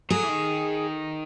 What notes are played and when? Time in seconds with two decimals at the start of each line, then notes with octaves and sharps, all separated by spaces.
0.10 F#3 G#4
0.24 E3
0.29 D#3